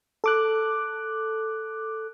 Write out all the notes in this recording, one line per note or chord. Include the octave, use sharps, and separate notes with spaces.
A4 D6 F#6